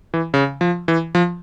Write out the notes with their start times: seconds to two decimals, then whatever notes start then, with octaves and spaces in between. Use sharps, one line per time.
0.14 E3
0.34 C#3
0.61 F3
0.88 E3
1.15 F3